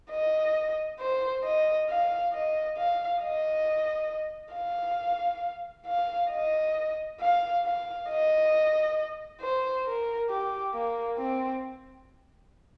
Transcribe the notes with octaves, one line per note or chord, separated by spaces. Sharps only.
D#5
C5
D#5
F5
D#5
F5
D#5
F5
F5
D#5
F5
F5
D#5
C5
A#4
G4
A#3
C4